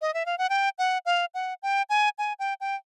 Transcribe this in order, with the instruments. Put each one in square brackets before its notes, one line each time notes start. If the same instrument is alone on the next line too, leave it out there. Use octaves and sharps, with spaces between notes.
[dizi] D#5
E5
F5
F#5
G5
F#5
F5
F#5
G5
G#5
G#5
G5
G5